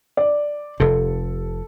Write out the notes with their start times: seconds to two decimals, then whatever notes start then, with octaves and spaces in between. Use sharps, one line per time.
0.17 D5
0.80 F1 C3 A4